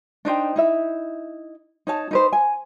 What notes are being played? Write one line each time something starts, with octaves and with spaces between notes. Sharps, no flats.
D4 D#4 C5 G5
D#4 E4 E5
D#4 C#5 A5
D#4 B4 C5
G#5